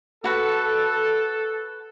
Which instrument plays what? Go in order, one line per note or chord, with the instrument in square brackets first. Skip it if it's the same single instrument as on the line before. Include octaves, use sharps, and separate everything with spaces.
[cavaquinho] F#4 B4 F#5 [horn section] A4